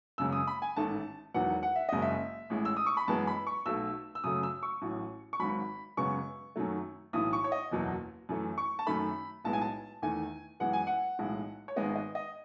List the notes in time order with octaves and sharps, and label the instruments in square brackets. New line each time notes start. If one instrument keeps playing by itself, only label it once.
[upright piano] F#1 F#2 C#3 G#3 E6
D#6
B5
G#5
A1 G#2 D#3 A3 A5
E1 E2 D#3 F#3 B3 F#5
F#5
E5
F#1 F#2 C#3 G#3 D#5
E5
A1 A2 G#3
E6
D#6
C#6
B5
F#2 E3 G#3 B3 A5
B5
C#6
B1 B2 A3 E6
E6
F#2 C#3 F#3 A3 D#6
E6
C#6
A1 A2 F#3
C#6
G#1 G#2 F#3 B5
F#2 C#3 G#3 B3 C#6
F#2 D#3 F#3 A3
B1 A2 E3 D#6
C#6
C#5
D#5
F#1 E2 B2 F#3
F#2 E3 A3
C#6
A5
F#2 D#3 A3 B5
B1 A2 G#3 B3 A5
G#5
A5
E2 D#3 A3 G#5
F#2 E3 G#3 B3 F#5
G#5
F#5
B1 A2 E3 G#3
C#5
G#1 G#2 D#3 G#3 B3 D#5
D#5
D#5